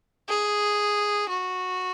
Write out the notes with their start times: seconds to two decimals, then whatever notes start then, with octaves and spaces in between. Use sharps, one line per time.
0.29 G#4
1.29 F#4